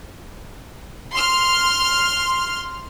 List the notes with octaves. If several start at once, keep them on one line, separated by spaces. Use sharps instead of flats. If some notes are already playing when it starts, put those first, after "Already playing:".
C6 F6